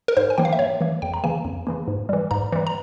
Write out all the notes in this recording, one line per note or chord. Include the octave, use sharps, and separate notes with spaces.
A#4
G#2 C5
G#5
E3 A#3 G5
F5
E5
G#2 C#5
E3 A#3
F2 G5
A#5
C#3 E3 A#3 G#5
F2
C#3 E3 A#3
G#2
E3 G3
G#2 A#5
E3 G3
A#5